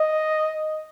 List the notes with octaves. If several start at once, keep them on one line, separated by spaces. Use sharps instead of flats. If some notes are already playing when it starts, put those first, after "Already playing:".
Already playing: D#5